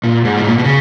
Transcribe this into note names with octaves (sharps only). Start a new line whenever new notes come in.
A#2
G#2
B2
A#2
B2
C#3